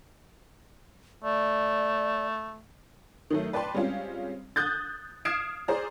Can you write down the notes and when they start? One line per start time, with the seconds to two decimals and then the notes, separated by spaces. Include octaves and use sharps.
1.24 A3 D5
3.30 D#3 F#3 A3
3.53 B4 D5 G5 A5 C6
3.74 G3 G#3 C4 C#4 F4
4.56 D#6 F#6 G6 A6
5.25 D#6 F6 G#6 C7 D7 E7
5.68 G#4 C5 D5 A#5